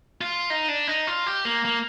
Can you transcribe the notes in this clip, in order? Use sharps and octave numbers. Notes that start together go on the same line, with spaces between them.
F4
D#4
D4
D#4
F4
G4
A#3
A#3